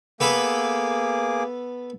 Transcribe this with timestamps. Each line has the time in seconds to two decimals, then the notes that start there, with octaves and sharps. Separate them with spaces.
0.20 A#3 B3 G#4 A4 B4 D6